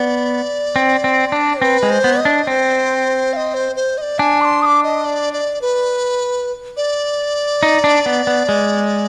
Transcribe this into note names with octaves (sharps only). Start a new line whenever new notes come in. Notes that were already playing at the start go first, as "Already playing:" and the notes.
Already playing: B3 D5
C4
C4
D4
C4 B4
G#3
C5
B3
D#5
D4
C4 C5
F5
D#5
C5
C5
D#5
D5
D4 G#5
D6
C6
D#6
D6
D#5
D5
D5
B4
D5
D#4
D4
B3
B3
G#3